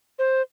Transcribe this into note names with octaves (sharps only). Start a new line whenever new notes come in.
C5